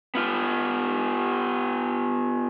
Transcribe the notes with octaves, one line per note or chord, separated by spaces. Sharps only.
B3 F4